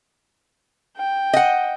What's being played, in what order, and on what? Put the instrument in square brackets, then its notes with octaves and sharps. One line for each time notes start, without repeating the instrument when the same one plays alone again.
[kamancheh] G5
[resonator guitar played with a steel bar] D#5 F#5